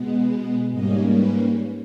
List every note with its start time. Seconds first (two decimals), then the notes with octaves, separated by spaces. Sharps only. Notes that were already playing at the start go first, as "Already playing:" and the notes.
Already playing: B2 G#3 B3
0.71 G#2 G3 A#3 C#4 D#5
1.14 B4